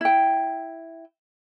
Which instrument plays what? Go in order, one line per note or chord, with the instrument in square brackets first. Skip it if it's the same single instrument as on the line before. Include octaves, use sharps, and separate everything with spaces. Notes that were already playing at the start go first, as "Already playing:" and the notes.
[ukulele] E4 G5